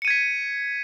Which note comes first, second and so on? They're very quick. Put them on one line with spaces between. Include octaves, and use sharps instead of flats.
C#7 D#7 G#6 B6